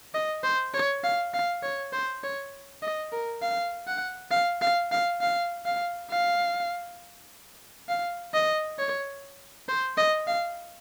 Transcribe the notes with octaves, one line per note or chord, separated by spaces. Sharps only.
D#5
C5
C#5
F5
F5
C#5
C5
C#5
D#5
A#4
F5
F#5
F5
F5
F5
F5
F5
F5
F5
D#5
C#5
C5
D#5
F5